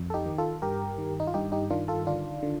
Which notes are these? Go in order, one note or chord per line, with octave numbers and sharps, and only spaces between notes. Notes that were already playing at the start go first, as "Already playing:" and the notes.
Already playing: F2
A4
D#4 G4
D#3
F4 A4
G2 G4 A#4
D#3
D#4
F4
G2 D#4 G4
D#4 G4
D#3 D4 F4
F4 A4
D3 D4 F4
D3